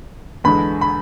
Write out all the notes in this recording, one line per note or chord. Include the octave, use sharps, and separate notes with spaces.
E2 D3 G#3 B5
B5